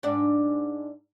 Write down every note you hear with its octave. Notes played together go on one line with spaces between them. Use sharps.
G#2 D4